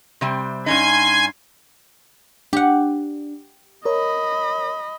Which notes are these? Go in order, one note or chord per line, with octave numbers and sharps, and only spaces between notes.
C3 G3 C4
G2 C#4 D#4 G#5 C6 G#6
D4 G4 F#5
A#4 C#5 D#5 B5